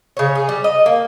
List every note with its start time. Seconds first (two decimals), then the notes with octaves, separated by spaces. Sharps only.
0.17 C#3 C#5
0.35 G#4
0.49 G3
0.64 D#5
0.86 A#3